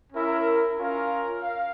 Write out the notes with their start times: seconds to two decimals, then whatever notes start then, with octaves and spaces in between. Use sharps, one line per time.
0.12 C#4 E4 A#4 E5
0.78 C#4 F4 A#4 F5
1.43 F5